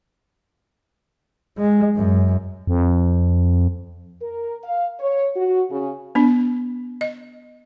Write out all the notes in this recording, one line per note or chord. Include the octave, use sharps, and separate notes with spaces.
G#3
F#2
F2
A#4
F5
C#5
F#4
C#3
B3 D4
D#5